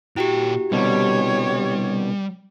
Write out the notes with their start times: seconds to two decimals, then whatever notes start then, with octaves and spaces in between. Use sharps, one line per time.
0.16 A#2 E4 F#4 G4 G5
0.72 C2 B2 D3 G3 C#5